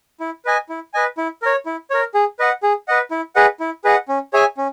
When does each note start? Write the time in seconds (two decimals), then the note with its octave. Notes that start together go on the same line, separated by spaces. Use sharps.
0.20 E4
0.45 B4 D#5 G#5
0.69 E4
0.94 B4 D#5 G#5
1.18 E4
1.42 A#4 C#5
1.66 E4
1.90 A#4 C#5
2.14 G#4
2.39 B4 D#5 F#5
2.63 G#4
2.88 B4 D#5 F#5
3.11 E4
3.35 G#4 B4 D#5 F#5
3.60 E4
3.84 G#4 B4 D#5 F#5
4.08 C#4
4.33 G#4 C#5 E5 G#5
4.57 C#4